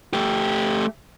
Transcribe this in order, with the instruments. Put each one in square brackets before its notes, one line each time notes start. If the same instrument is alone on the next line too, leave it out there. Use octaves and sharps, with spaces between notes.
[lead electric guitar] A3 G4